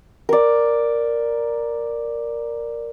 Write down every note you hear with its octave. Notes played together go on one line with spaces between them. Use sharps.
A#4 D5